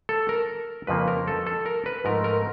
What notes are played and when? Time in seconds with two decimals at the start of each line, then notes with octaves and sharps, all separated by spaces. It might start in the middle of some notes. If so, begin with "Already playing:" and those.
0.09 A4
0.29 A#4
0.87 F2 C#3 F3 A#3 B4
1.08 A#4
1.28 A4
1.47 A4
1.66 A#4
1.86 B4
2.05 G#2 F3 A3 A#4
2.24 A#4